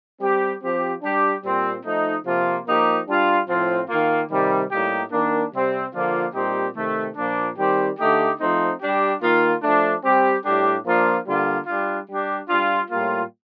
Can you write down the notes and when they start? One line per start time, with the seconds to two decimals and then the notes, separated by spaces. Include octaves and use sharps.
0.20 G3 C4 G4
0.61 F3 C4 G4
1.02 G3 D4 G4
1.43 A#2 G3 C4
1.84 F3 A3 D#4
2.25 C3 F3 A#3 F4
2.66 F3 A#3 D#4 G4
3.07 G3 D4 F4
3.48 A2 F3 C4 F4
3.88 D#3 A#3 F4
4.30 C3 D#3 G3
4.71 A2 G3 A#3 D#4 G4
5.12 D#3 A#3 D4
5.52 C3 G3 C4
5.94 D3 F3 A#3 D4 F4
6.34 A#2 G3 C4 D#4 G4
6.76 C3 D#3 A3
7.16 A#2 F3 A#3 D4
7.58 D#3 G3 C4 G4
7.99 D3 A3 D#4 G4
8.39 F3 A3 C4 D#4
8.81 G3 D4 G4
9.21 D#3 A#3 F4
9.63 F3 A3 D4
10.03 G3 C4 G4
10.44 A2 G3 D4 G4
10.85 F3 A#3 D4 F4
11.26 D3 G3 A#3 F4
11.67 G3 D4 F4
12.08 G3 D4 G4
12.49 G3 D4 F4
12.90 A2 G3 A#3 F4